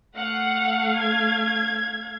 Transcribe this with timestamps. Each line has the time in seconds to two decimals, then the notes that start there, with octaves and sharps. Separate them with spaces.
0.16 A3 F5 F#5
0.99 G#6